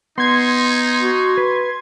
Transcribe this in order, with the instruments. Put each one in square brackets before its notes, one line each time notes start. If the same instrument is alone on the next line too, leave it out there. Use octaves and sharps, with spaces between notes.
[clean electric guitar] B3 [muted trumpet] D#4 [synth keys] C6 G#6
[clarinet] F#4
[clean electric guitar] B4